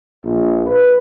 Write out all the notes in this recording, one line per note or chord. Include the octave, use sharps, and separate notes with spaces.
A#1
B4